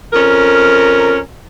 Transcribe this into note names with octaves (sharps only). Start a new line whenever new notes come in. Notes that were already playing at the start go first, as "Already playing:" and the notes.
F2 C#4 A#4